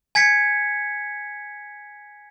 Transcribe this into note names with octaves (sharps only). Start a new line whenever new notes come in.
G#5 G#6 B6 C#7